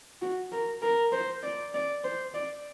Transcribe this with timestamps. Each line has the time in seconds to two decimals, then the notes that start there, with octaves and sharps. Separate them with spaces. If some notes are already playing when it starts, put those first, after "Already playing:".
0.22 F#4
0.52 A#4
0.82 A#4
1.12 C5
1.43 D5
1.74 D5
2.04 C5
2.34 D5